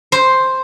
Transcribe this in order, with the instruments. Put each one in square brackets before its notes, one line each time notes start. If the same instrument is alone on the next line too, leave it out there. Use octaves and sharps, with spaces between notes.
[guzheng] C5